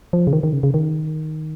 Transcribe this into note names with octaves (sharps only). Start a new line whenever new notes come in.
F3
C#3
D#3
D#3
C#3
C#3
D#3